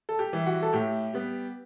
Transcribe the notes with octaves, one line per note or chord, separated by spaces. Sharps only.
A4
G4
E3 G3
F#4
A4
A2 G4
G3 B3